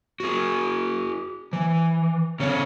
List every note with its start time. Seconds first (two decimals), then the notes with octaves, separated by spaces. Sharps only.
0.20 F#4 G#4
1.53 E3
2.39 C#3 C#4 A4 C#5